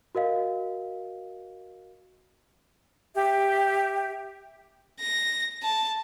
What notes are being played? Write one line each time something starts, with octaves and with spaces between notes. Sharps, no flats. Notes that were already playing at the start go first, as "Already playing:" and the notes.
F#4 A#4 D#5 F5
G4 E5
A#6
A5